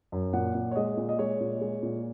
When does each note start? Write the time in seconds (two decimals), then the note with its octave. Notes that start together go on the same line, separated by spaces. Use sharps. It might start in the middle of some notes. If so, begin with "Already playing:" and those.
0.12 F#2
0.33 A#2 F#5
0.55 A#2
0.71 C#5
0.76 G#3 D#5
0.97 A#2
1.09 D#5
1.19 G#3 C#5
1.41 A#2
1.61 G#3
1.83 A#2